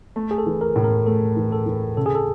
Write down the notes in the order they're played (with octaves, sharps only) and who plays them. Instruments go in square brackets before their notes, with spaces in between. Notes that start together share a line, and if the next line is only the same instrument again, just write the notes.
[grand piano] A3
[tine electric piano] G#4
A4
[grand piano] E3
[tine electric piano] A#4
[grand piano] A2
[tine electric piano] A#4
[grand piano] A3 [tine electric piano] A4
[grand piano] E3
[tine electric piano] A4
[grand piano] E3
[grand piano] C#3 [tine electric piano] A4
[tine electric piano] G#4
A4